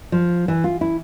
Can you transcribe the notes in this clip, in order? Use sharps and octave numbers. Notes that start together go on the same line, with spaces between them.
F3
E3
F4
E4